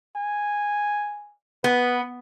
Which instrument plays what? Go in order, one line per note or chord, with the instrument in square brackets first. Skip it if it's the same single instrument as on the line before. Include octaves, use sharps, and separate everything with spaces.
[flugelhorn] G#5
[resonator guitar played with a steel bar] B3 [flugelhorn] B4